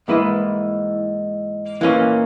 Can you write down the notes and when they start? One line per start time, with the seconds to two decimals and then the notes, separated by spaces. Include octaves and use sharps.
0.08 G#2 E3 A#3 E4 B4 D#5
1.81 A#2 E3 A#3 C#4